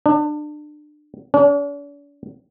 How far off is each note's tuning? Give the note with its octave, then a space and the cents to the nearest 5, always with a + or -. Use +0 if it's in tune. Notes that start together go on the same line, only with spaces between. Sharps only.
D4 +30
D4 -45